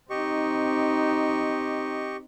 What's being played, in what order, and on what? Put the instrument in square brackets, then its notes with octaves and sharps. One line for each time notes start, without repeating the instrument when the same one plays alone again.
[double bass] C4 D#4 [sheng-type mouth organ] G4 D#5 C#6